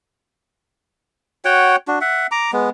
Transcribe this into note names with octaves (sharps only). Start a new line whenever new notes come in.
F#4 C#5 F#5 G5
D4 F#4
E5 F#5
A#5 D6
G#3 B3